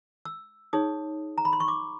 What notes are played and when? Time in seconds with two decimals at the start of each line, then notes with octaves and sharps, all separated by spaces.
0.25 E6
0.73 D#4 G#4 C#5 D#6
1.38 A#5
1.45 B5
1.53 C6
1.60 C#6
1.68 D6